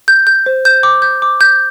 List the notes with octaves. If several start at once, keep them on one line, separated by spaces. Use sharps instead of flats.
G6
G6
C5
G6
D6
G6
D6
G6